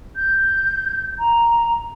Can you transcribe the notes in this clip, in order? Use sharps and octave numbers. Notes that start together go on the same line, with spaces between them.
G6
A#5